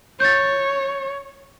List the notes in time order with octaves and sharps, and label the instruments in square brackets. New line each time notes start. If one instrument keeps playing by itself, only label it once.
[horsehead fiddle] C#5 [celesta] G6 A6